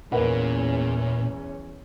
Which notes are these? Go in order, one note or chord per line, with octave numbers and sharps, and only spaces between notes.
E2 A#2 C#4 A#4 B4 F#5